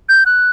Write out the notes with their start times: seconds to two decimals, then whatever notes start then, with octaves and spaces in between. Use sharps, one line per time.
0.09 G6
0.26 F#6